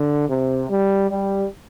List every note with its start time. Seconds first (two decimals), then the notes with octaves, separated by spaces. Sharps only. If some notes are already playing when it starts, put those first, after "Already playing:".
Already playing: D3
0.28 C3
0.70 G3
1.10 G3